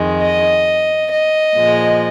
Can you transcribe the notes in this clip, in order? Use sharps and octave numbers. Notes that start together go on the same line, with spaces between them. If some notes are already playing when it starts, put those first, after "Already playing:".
Already playing: F2 D#3 G#3
D#5
D#5
A#2 F3 G#3